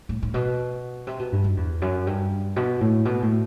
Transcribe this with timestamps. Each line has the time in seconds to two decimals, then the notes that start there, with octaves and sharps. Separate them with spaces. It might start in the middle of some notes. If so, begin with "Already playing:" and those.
0.09 A2
0.23 A2
0.34 B2
1.07 C3
1.19 B2
1.32 G2
1.44 F#2
1.57 E2
1.82 F#2
2.07 G2
2.56 B2
2.81 A2
3.05 B2
3.22 A2